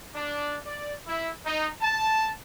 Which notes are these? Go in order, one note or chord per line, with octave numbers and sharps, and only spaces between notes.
D4
D5
E4
D#4
A5